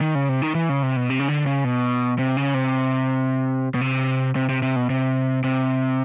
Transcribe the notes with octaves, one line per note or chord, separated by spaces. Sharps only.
D#3
C#3
C3
D#3
E3
C#3
C3
B2
C3
C#3
D3
C#3
B2
C3
C#3
C3
B2
C3
C3
C3
C3
B2
C3
C3